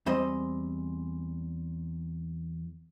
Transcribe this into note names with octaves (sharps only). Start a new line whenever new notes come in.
E2 G3 C4 D#5